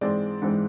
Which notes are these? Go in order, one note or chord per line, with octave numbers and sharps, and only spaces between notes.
G#2 E3 G#3 C4 D5
G#2 E3 G#3 C4